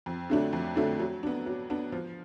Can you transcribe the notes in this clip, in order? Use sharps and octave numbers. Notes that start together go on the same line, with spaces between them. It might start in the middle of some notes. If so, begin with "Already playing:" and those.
F2
D3 F#3 A3 D4
F2
D3 F#3 A3 D4
F#3
B3 D4
F#3
B3 D4
F3